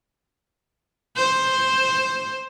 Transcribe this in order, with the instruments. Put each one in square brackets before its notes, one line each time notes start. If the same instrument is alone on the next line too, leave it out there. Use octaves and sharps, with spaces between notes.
[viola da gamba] C5